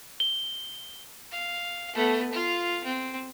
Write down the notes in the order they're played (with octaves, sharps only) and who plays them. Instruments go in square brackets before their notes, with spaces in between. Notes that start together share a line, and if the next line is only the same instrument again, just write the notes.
[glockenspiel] G7
[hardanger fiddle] F5
A3 B3
F4 F5
C4